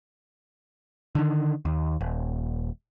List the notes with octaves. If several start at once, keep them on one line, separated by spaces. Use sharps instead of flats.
D3 D#3
D#2
D#1